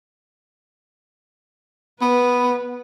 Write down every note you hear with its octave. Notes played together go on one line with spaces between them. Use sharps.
B3 B4